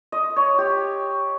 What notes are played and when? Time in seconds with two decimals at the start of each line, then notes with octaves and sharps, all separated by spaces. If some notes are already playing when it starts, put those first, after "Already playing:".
0.12 D#5
0.36 C#5
0.58 G4